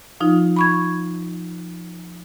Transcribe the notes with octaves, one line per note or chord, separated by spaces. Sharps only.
F3 D#4 F4
B5 C#6 G#6